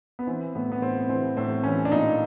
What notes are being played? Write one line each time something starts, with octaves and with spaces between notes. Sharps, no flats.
B3
E3 C4
A2 B3
B3
A2 C4
E3 C4
A2 C4
E3 C#4
D4
A#2 D#4